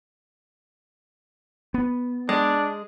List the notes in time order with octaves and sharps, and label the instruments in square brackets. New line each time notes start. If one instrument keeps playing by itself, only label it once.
[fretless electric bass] B3
[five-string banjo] G#3 [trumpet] D4